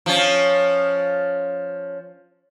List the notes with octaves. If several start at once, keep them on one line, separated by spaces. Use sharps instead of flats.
F3 C#4